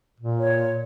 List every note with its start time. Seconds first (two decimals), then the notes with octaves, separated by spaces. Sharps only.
0.20 A#2
0.38 C#5